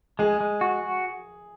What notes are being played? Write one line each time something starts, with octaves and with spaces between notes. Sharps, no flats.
G#3 G#4
G#3
F#4